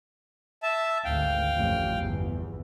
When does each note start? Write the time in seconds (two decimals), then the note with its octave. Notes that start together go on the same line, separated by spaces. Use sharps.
0.63 E5 A5
1.04 G#1 D2 D#3 F5 G5
1.55 A1 F2
1.96 G1 E2